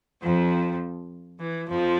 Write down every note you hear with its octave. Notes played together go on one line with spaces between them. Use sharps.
F2 F3
E3
F2 F3